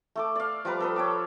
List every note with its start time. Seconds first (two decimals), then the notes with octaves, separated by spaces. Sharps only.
0.16 A3 A4 D6
0.36 D5 F5
0.65 F3 G3 B4 A#5
0.80 A4 B4 D#6
0.96 C#5 G5 D6